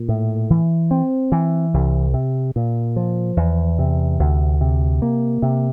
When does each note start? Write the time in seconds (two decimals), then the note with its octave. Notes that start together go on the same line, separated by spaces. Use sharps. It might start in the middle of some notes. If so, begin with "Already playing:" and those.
Already playing: A#2
0.09 A2
0.50 E3
0.91 C4
1.32 E3
1.74 C2
2.14 C3
2.56 A#2
2.96 F3
3.37 E2
3.79 C3
4.19 D2
4.61 C3
5.02 A#3
5.42 C3